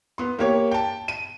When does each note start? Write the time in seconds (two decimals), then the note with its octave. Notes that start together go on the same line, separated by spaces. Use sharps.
0.18 B3 C6
0.39 A#3 G4 C#5
0.71 G5 A5
1.08 D#7